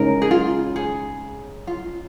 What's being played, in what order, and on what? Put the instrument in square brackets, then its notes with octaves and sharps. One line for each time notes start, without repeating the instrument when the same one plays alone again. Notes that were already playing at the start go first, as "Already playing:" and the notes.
Already playing: [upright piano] C#3 G#3 D#4 C#5 [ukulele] A#4
[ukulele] G#4
F4
G#4
F4